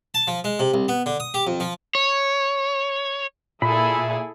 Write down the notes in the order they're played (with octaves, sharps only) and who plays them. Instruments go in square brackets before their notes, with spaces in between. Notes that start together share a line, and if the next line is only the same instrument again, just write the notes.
[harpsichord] A5
F3
G#3
C3
C2
B3
D3
D#6
G4
F2
F3
[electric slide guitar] C#5
[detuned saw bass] A#2 [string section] E4 G#4 A4 [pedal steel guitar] B5